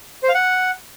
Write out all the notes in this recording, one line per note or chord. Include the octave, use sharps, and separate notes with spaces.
C5
F5
F#5